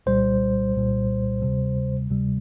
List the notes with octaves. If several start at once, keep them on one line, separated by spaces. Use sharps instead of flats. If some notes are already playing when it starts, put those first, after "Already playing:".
C2 A#2 G3 C5
C2 A#2 G3
D2 C3 G3
D2 C3 G3